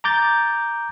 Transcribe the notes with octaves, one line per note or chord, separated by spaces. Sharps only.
A#5 D6 G6 A6